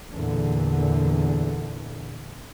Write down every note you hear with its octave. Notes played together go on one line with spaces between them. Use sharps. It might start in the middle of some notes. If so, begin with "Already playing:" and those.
E2 A#2 D3